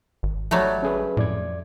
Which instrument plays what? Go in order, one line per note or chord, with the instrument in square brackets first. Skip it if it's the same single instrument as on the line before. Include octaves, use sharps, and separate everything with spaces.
[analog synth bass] G#1
[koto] F#3 G3 A3
[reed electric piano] C#4 G#4 B4
[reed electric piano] F2 D5 G#6 [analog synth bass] A2